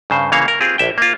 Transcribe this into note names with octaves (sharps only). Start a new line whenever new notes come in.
G2 C#3 C5
C#3 E3 A#3 C#5 F5
A#4
C4 F4 G4 G#4
A#1 E5 G5
A#3 F4